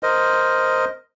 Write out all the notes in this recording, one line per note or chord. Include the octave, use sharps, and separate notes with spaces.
A#4 C5 D#5